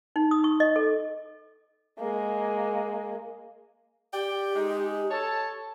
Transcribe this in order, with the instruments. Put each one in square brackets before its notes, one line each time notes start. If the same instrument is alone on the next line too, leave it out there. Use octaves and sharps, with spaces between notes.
[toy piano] D#4
D#6
C#6
D#5
A4
[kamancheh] G#3 A#3
[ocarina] G4 [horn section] D5 G5
[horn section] G#3 D#4
A4 C#5 A5